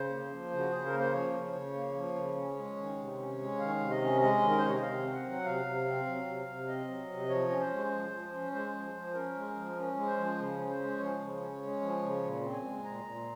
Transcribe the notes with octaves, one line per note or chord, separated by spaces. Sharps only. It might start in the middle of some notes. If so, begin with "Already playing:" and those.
Already playing: C#3 C5
A#3
F3
C#3
F#4
C#3 G#4
A#4
A#3
C5
F3 C#5
C#3
C#3
A#3
F3
C#3
C#4
G#3
D#3
C3
C#4
G#3
D#3 F5
C3
D#5
C#4
G#3 D#5
D#3
A#4
C5
C3 C#5
D#5
C3 F5
C4
F#5
F#3
C3 F5
C3
C4
F#3
C3
C3
C4 D#5
F#3
C3
F3 C#5
C#4
C5
G#3
F3
F3
C#4
G#3 C5
F3
F3
C#4 A#4
G#3
F3
C#4
G#3
C5
F3
C#3
C#4
C5
G#3
F3 C#5
C#3
C#4
G#3
F3
C#3
A#2
C4
G#5
G#3
A#2 A#5
A#2